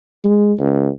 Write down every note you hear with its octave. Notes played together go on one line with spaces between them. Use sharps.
G#3
C#2